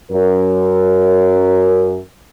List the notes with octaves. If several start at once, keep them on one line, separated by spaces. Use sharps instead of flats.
F#2 A#4